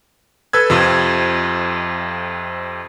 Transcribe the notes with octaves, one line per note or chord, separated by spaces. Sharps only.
A4 B4 E6 G#6
F2 C3 F3 F4